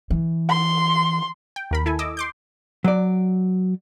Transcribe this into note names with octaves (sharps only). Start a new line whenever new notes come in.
E3
C6
G5
D#2 A#4 B5
E4 A4 G#5
D#5 D6 E6
C6 D6 G6
F#3 D5